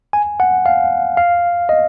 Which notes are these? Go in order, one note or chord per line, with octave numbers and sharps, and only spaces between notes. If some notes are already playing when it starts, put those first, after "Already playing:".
G#5
F#5
F5
F5
D#5